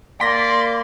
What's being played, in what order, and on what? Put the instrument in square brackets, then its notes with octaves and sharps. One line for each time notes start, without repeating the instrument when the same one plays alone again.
[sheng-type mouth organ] A#3 [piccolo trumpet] D5 [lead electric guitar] C6 [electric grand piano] A#6 B6